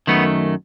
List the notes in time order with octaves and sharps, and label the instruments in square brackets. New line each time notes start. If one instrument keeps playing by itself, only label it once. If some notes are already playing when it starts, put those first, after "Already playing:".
[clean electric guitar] F#2 D#3 A3 B3